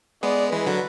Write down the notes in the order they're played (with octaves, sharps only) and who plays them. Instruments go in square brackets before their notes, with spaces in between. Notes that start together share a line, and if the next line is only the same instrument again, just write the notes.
[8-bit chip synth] G#3 B3 [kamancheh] D5
[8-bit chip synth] E3 G#3 [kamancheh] B4
[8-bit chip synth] D3 F#3